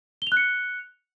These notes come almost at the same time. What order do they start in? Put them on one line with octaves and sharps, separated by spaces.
G7 F7 F#6 C#7